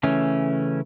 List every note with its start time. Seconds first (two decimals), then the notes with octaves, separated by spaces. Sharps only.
0.03 C#3 E3 A3 C#4